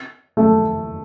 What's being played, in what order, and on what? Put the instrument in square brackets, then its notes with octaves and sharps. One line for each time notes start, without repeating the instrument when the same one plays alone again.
[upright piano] A3